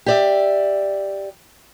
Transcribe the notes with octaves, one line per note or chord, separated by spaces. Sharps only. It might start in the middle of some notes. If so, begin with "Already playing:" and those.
G4 D5 E5